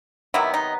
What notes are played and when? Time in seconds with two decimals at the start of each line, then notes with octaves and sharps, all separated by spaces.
0.34 C3 D#3 F#3 B3 E4
0.54 D#4